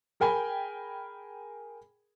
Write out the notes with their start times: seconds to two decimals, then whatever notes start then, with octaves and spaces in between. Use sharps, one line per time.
0.20 G#4 A#4 G5 G#5 B5